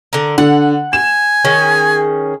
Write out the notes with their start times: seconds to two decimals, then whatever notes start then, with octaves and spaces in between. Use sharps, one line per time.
0.13 D3 A#4
0.38 D3 F#5
0.93 G#5 E7
1.45 D#3 C#4 G#4